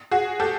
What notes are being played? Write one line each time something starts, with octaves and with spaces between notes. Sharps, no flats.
F#4 G#4
G4 A4